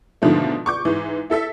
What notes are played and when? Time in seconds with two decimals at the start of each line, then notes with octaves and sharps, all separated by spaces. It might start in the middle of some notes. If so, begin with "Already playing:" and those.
0.22 G#2 B2 D3 D#3 F3 A3
0.66 C#6 D6 G6
0.85 G#2 E3
1.30 E4 A4 E5 B6